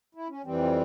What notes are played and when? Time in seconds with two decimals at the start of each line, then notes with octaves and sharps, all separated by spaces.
0.15 E4
0.29 C#4
0.44 F2 E3 G3 C4